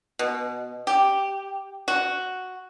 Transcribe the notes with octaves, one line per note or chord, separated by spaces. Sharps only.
B2
G4
F#4